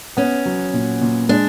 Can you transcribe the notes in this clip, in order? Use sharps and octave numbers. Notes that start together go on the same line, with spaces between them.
B3 C#4
F#3
A#2
A#2
G#3 D4